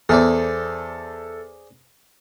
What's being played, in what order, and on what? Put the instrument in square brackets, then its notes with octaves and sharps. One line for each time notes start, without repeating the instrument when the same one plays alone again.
[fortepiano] E2 [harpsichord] G#4 C5 D5 [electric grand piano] A4